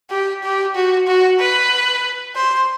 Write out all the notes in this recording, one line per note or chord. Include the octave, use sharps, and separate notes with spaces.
G4
G4
F#4
F#4
B4
C5